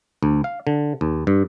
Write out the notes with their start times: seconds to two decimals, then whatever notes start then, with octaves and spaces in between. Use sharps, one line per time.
0.23 D2
0.44 F5
0.67 D3
1.01 D#2
1.27 G2